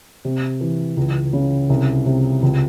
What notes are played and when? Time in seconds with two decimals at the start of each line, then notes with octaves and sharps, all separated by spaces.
0.25 C3
0.61 E3
0.97 C#2
1.33 C#3
1.70 C2
2.06 C3
2.43 C#2